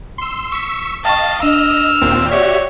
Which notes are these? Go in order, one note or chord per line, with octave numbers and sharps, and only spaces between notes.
C6 E6
C#6 E6 B6
D#5 F5 G5 A5 C#6
D4 D#5 E6 F6
D#2 A#2 C4
F#4 G4 C#5 D5 E5